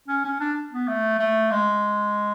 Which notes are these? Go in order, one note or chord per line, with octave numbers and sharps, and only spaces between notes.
C#4
C#4
D4
B3
A3
A3
G#3